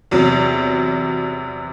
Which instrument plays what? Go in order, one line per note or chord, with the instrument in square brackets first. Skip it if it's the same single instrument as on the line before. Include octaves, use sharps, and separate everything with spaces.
[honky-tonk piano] E2 C3 F#3